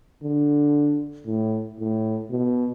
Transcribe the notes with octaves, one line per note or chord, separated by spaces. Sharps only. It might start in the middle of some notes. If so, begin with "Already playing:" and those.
D3
A2
A2
B2